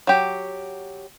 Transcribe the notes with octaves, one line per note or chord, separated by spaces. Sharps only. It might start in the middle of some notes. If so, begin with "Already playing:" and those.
F#3 G4